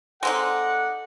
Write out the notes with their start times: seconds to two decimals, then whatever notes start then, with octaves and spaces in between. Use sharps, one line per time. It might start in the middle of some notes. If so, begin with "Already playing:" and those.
0.23 G#3 C4 D#4 A4 D5 F#5